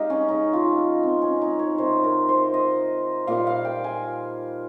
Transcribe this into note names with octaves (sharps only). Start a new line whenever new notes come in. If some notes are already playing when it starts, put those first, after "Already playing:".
Already playing: G#3 D#4 G4 D#5 F5
C#4
C#3 G#3 D#4
F4
D#4
C4
C#4
D#4
C#5
C3 D#3 G3 C5
A#4
C5
D#5
A#2 G3 F5
F5
G5
G#5